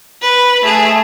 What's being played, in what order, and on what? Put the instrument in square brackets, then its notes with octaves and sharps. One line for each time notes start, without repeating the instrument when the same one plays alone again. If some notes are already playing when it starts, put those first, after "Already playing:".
[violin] B4
A3 G#4